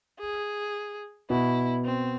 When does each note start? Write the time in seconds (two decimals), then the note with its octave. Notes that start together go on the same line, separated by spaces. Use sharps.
0.20 G#4
1.30 B2 E4
1.85 C4